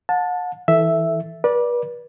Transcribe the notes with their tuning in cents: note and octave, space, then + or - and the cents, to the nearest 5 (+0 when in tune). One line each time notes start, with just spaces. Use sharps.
F#5 -40 A5 +0
E3 -15 A4 +0 E5 +0
B4 -35 D5 +0